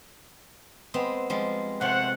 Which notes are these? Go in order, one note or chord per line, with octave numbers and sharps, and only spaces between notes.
G#3 B3 C4
F3 G3 G#3
C3 A3 F4 C5 F#5